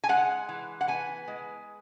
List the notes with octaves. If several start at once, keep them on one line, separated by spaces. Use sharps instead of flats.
G#5
G#3 F#5
E3
F#5
B3 G#5
G#3